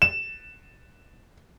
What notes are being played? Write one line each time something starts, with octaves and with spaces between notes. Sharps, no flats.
E7